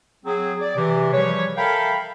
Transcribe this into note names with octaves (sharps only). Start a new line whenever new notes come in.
F#3 C4 G#4
D5
C3 E3
F3 G3 G#4 B4 C#5
A4 A#4 E5 F5 G5 B5